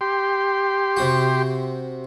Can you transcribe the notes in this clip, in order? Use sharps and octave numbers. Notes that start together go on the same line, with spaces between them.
G4 C6
C3 F#4